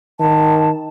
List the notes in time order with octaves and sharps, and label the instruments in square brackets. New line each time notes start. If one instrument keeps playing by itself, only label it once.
[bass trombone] D#3 [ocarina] A5